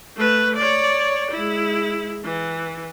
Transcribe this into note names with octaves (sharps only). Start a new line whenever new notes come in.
A3 B4
C#5 D5
G#3 E4
E3